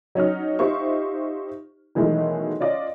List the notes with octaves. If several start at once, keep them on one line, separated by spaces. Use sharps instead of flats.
F#3 C#4 D#4 F6
D#4 F4 G4 C5 E5 C#6
B2 D#3 E3 F#3 G#3 A3
C#4 F4 D5 D#5